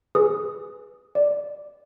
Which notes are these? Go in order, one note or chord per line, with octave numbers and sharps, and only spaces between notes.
G#4 B4 D#6
D5